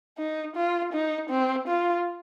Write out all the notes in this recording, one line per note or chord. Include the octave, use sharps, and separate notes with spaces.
D#4
F4
D#4
C4
F4